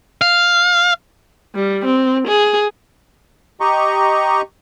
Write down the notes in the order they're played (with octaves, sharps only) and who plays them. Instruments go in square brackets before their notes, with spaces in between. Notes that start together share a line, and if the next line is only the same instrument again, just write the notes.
[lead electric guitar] F5
[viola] G3
C4
G#4
[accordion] G4 D#5 A#5 C#6